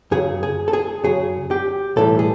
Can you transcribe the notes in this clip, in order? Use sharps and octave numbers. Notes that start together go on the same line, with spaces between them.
F#2 C#3 F#3 G#4
G#4
A4
G#4
F#2 C#3 F#3 G#4
G4
B1 A2 E3 G3 A4
G#4